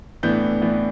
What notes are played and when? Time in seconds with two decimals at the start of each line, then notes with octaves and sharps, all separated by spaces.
0.23 A2 E3 B3 D4 G6
0.62 A2 E3 B3 D4